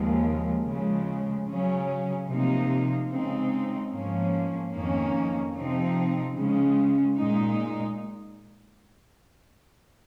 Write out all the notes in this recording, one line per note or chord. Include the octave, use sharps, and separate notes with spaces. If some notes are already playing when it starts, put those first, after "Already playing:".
Already playing: D#2 C#3 F3 G#3
C#3 F3 G#3
C#3 F#3 C#4
C3 F3 A#3 D#4
C#3 G#3 C4 D#4
G#2 F3 A#3 C#4
F2 D#3 A#3 C#4
C3 F3 C4 D#4
C#3 G#3 C#4
A#2 G#3 D#4